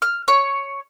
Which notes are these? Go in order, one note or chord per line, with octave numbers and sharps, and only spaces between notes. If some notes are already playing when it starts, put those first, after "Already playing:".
F6
C#5